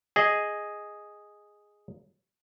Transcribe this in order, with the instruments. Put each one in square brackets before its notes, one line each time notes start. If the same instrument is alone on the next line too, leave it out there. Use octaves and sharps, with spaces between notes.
[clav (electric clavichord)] G#4 D#5